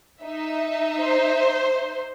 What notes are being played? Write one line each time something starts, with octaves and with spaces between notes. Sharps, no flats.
D#4 E5
C5